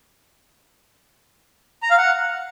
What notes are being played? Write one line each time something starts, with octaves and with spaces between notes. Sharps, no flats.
A#5
F5
F#5